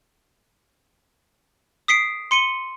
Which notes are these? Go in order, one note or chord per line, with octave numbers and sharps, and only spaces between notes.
D#6 B6 C7 D7
C6 C#7 D#7 G7